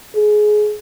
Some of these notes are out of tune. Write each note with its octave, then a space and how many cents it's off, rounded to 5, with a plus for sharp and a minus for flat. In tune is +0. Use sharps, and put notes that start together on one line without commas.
G#4 +20